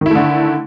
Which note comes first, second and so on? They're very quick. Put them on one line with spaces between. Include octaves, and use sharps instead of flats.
D#3 E4 A3 D3